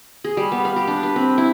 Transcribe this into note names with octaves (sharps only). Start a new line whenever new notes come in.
G#4
G3
B3
F5
G4
D4
B4
C4
E4